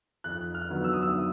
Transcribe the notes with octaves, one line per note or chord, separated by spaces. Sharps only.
F2 F#6
F6
D3 F#3 B3
E6
D#6
E6